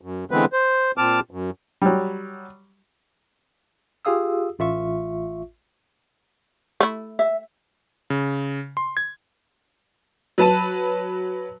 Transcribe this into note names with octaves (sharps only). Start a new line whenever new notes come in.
F#2
D3 E3 G#3 B3 C4 B4
C5
A#2 C4 A5 D6 F6
F#2
F#3 G3
F4 G4 G#4 F5 D#6 E6
A1 F4 E5 C#6
A3 E4
E5
C#3
C6
G#6
F#3 B4 A5 D#7